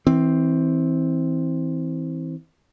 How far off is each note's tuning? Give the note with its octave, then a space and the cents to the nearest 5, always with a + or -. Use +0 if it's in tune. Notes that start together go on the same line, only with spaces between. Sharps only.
E3 -25 C4 +0